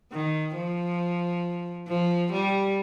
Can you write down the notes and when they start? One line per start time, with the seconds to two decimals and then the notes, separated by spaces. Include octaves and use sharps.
0.12 D#3
0.56 F3
1.88 F3
2.32 G3